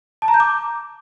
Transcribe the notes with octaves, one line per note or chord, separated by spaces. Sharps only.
A5
A#5
G6
D6